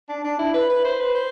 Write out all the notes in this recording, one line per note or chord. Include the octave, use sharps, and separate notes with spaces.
D4
D4
E4
B4
B4
C5
B4
C5